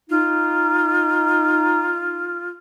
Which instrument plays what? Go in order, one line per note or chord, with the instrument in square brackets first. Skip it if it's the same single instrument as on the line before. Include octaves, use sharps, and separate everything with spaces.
[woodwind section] D#4 [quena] F4